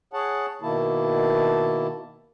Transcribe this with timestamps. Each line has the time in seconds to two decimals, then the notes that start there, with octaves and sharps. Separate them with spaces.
0.13 G#4 C#5 F#5 A5
0.62 B2 D#3 A#3 E4 A5